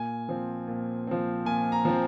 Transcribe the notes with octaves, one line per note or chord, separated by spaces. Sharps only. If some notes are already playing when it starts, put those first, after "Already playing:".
Already playing: A#2 G#5
F3 C4
A#2
F3 C4
A#2 G#5
A#5
F3 C4